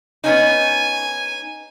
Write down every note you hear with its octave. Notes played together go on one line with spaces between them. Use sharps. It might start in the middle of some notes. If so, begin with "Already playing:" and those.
B3 C#4 D#4 G#5